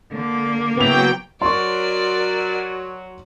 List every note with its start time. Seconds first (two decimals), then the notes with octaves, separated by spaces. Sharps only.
0.14 D3 A#3
0.77 C#3 F#3 B3 E4 G5 F7
1.42 F#3 A#4 D5 C6 C#6